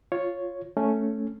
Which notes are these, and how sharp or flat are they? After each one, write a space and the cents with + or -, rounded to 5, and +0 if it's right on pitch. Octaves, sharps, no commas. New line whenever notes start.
F4 +0 C#5 +0
A3 +0 C#4 +0